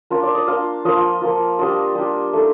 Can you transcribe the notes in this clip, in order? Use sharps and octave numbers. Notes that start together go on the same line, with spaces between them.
A#3 D4 F4
D5
D#5
A#3 D4 F4 F5
F3 A#3 F4 D#5
F3 A#3 F4
G3 D4 F4 D#5
G3 D4 F4
A3 D#4